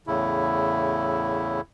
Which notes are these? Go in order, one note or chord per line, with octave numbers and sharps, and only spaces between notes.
E2 A2 C#3 E4